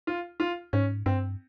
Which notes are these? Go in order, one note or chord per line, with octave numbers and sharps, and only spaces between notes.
F4
F4
G#2 C#4
G2 C4